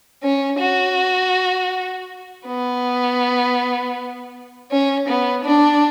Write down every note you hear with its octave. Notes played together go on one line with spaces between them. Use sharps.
C#4
F#4
B3
C#4
B3
D4